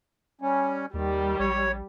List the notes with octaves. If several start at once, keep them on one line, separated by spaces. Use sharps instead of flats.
G3 C#4
D#2 D#3 G3
A#1 C#5